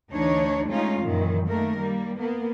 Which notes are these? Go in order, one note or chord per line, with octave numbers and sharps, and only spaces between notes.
D2 E3 D4 D#4 C#5
G#3 A3 C#4 D#4 F4
F#2 A#2 D#3 E3
D#3 A3 A#3 A#4
G3 A#3
A#3 B3